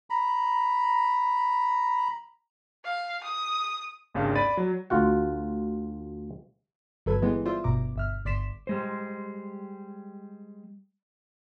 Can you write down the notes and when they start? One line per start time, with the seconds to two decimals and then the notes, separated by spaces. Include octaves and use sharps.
0.10 A#5 B5
2.85 F5
3.24 D#6
4.14 G#1 D#2 C#3 D4 F5
4.36 D5 B5 A6 D#7
4.57 F#3
4.90 D2 F4 F#4 F#5
7.06 G1 F#3 A4 B4 G#6
7.22 E3 G3 G#3 B3
7.46 F4 C5 D5 E5
7.64 G1 B2 A#5 D6
7.96 G1 E5 F6
8.25 G1 D5 C6 B6 E7
8.67 G3 G#3 C5